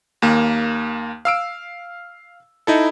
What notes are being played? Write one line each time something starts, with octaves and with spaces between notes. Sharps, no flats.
D#2 A#3
F5 E6 D7
D#4 E4 A4